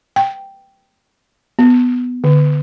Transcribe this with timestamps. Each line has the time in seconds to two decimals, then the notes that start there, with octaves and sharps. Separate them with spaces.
0.16 G5
1.59 B3
2.24 D3